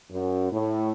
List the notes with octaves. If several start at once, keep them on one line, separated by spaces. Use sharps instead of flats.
F#2
A2